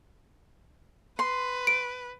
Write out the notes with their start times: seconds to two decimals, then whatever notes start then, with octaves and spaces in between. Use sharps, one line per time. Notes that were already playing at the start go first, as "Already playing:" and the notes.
1.19 B4 C6
1.67 D7